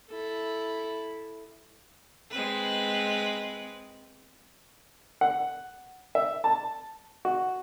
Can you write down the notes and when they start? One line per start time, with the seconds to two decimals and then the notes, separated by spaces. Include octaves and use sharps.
0.10 E4 A4
2.31 G#3 C4 B4
5.21 F#5
6.15 E5
6.44 A5
7.25 F#4